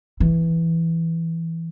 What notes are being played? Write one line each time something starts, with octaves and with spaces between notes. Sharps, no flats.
E3